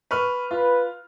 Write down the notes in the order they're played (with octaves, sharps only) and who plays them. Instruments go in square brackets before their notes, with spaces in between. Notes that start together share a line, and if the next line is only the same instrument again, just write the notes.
[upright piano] B4 C#6 F6
[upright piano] F4 [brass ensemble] B4